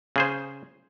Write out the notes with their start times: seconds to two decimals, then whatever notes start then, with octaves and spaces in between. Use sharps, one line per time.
0.16 C#3 G#4 C5